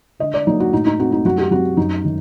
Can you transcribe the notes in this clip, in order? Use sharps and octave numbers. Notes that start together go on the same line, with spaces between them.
D3 D#5
D5
F#3 A#3 D#4
F#4
A2 D#4
D#4
A3 C4 F#4
D#4
F#2 F#4
G4
F#3 C4 F#4
F#2 D#4
D#3